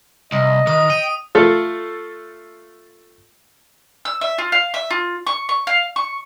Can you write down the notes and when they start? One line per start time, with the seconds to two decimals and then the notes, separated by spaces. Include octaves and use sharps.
0.32 C2 D#5
0.67 D#3 D#6
0.90 G5 D#7
1.35 A3 F4 A4
4.05 E6
4.21 E5
4.38 F4
4.52 F5
4.74 E5
4.91 F4
5.27 C#6
5.49 C#6
5.67 F5
5.96 C#6